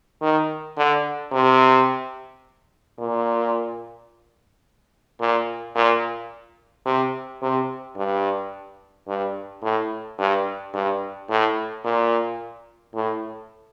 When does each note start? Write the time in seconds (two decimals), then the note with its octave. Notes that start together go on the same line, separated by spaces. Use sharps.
0.22 D#3
0.77 D3
1.32 C3
2.99 A#2
5.20 A#2
5.75 A#2
6.86 C3
7.42 C3
7.97 G2
9.08 G2
9.63 A2
10.19 G2
10.74 G2
11.30 A2
11.84 A#2
12.95 A2